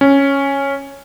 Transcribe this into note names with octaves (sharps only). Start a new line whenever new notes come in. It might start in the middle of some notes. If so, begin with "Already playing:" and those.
C#4